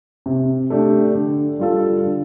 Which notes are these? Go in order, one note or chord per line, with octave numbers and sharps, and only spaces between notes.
C3
A3 D4 G4
D3
G3 F4 A4
D3